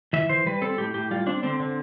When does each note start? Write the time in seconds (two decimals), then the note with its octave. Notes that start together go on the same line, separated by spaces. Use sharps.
0.13 E3 E5
0.29 E3 C5
0.47 G3 B4
0.62 C4 A4
0.78 A2 G4
0.94 A2 G4
1.11 G3 F4
1.27 C4 D4
1.43 D3 C4
1.60 D3